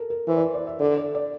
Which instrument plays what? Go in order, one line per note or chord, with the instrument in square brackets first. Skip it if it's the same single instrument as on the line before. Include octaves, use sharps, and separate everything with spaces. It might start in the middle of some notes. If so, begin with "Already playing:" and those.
Already playing: [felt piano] A4 A#4
A#4
[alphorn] E3 [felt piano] C5
[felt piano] D5
C5
D5
E5
[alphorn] D3 [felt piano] D5
[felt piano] D5
D5